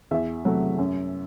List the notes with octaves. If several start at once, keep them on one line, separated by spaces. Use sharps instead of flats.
E2 E5
C3 F#3 A3
F#2